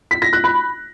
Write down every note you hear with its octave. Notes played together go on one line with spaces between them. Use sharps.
B6
A#6
F#6
B5